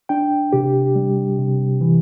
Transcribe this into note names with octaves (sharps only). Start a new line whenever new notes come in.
D4 G5
C3 G4
G3
C3
E3